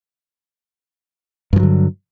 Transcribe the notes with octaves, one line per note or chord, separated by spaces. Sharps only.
G2 D3 F3 F#3